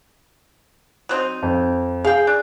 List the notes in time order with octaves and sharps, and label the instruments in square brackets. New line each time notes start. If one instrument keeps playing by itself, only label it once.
[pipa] F#3 C4 D#4
[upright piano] F2
[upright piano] G#4 [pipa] F5 G5
[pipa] D4